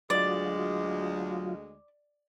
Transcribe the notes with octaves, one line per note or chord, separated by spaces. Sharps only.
D2 F#3 G#3 F4 D5